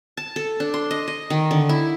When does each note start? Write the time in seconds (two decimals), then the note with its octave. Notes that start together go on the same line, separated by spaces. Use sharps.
0.17 A5
0.36 A4
0.60 D4
0.74 C6
0.91 D#5
1.08 D#5
1.30 D#3
1.51 D3
1.69 E4